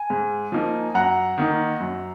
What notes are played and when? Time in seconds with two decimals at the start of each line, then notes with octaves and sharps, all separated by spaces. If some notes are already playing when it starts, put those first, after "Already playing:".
Already playing: G#5
0.10 G#2
0.52 F3 A#3 D#4
0.95 F#2 F#5 A#5
1.38 D#3 A#3 D#4
1.80 F#2